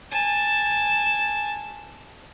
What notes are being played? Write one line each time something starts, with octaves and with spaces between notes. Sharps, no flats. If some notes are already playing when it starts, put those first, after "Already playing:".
G#5 A5